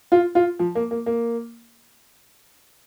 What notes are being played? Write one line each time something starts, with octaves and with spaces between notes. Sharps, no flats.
F4
F4
F3
A#3
A#3
A#3